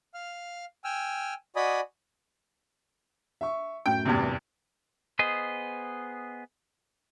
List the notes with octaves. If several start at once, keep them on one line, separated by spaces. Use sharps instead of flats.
F5 F6
G5 G#5 E6 F6
F#4 D5 D#5 G#5 B5 D#6
E5 C#6
F#2 A2 G5
E2 G2 C3
B3 G#4 C5 D#5